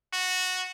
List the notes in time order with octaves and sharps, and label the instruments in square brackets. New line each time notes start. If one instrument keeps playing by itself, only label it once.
[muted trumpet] F#4